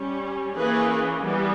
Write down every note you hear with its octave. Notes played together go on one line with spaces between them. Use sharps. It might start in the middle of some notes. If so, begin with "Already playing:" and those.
Already playing: G3 C#4
E3 A#3 C#4 G#4 B4
E3 G3 B3